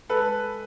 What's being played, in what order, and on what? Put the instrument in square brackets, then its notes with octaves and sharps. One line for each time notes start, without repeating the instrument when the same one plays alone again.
[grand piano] G#3 A4 B4